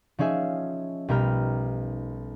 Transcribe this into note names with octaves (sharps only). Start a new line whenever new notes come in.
F3 C#4 D#4 G#4 E5
B1 G3 A#4 G5 F6